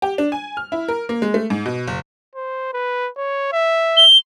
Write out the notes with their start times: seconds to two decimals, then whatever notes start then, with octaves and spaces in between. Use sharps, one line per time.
0.02 G4
0.18 D4
0.32 G#5
0.57 F6
0.72 E4
0.88 A#4
1.09 A#3
1.22 G#3
1.34 A3
1.50 G#2
1.66 B2
1.88 F#1
2.35 C5
2.73 B4
3.17 C#5
3.52 E5
3.97 G7